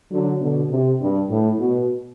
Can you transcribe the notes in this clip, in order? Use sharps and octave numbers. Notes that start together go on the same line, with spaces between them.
D3 F#3
B2 D3
C3
G2
A2
B2